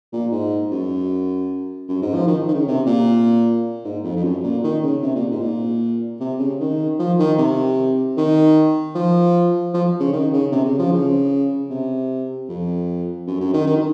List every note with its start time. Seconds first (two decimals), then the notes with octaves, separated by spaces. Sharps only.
0.12 A#2
0.31 G#2
0.71 F#2
1.88 F#2
2.02 G#2
2.14 F3
2.27 D#3
2.48 D#3
2.54 C#3
2.67 C3
2.86 A#2
3.85 G#2
4.04 F2
4.16 F2
4.23 F#2
4.43 A#2
4.64 D#3
4.83 C#3
5.02 C3
5.15 A#2
5.31 G#2
5.41 A#2
6.20 C3
6.39 C#3
6.60 D#3
6.99 F3
7.19 D#3
7.38 C3
8.17 D#3
8.95 F3
9.74 F3
10.00 C#3
10.13 D#3
10.33 C#3
10.52 C3
10.65 C#3
10.79 F3
10.91 C#3
11.70 C3
12.49 F2
13.27 F#2
13.40 F#2
13.54 D#3
13.67 D#3